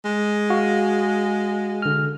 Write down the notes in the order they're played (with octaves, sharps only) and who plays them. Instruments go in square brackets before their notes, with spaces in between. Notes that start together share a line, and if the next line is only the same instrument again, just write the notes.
[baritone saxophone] G#3
[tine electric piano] F#4 F5
D3 F6